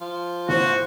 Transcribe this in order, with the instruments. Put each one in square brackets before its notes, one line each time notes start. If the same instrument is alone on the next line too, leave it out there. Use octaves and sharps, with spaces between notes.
[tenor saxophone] F3
[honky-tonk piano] A1 C5 [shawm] F#4